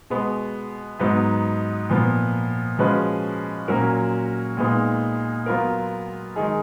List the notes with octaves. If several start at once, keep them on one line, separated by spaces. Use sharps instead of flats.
B2 G#3 B3
G#2 F#3 B3 D#4
A#2 F3 B3
F3 G#3 C#4 F#4 B4
A#2 F#3 C#4 F#4 A#4
A#2 G#3 B3 D#4
F#3 B3 F4 A#4
D#3 G#3 D#4 G#4